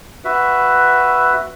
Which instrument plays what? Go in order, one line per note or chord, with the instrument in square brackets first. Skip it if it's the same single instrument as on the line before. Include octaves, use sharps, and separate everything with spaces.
[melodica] F#4 B4 E5